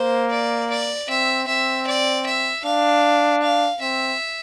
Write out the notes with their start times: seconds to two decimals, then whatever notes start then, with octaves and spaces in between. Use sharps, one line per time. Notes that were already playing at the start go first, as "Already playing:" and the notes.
Already playing: A#3 C5
0.31 D5
0.70 D5
1.09 C4 E5
1.48 C4 E5
1.87 D5
2.26 E5
2.65 D4 F5
3.42 F5
3.81 C4 E5